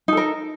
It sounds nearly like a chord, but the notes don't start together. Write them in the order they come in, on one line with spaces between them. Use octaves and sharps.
D#4 A4 A#4